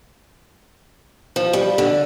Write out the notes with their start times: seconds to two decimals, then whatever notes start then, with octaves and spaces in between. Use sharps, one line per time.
1.36 F3
1.53 G3
1.78 D3